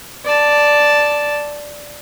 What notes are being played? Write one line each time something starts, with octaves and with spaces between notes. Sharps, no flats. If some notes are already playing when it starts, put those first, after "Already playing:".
D5 A5